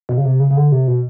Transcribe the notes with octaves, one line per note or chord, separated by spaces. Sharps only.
B2
C#3
C3
C#3
C#3
D3
C3
B2